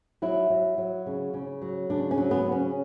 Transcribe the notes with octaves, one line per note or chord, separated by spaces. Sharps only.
F#3 E4
F#3
F#3
C#3
C#3
F#3
C#3 D4
C#4
F#3
B3
C#3
C#4